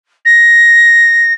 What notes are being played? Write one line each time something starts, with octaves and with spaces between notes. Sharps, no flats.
A#6